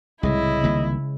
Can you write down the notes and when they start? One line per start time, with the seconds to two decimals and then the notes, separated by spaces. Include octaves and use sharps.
0.23 C2 A2 C#3 G#3 E4 D#5
0.64 C2 D#3 A#3